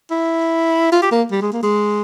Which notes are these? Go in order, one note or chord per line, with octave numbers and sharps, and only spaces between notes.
E4
F4
G4
A#3
G3
G#3
A#3
G#3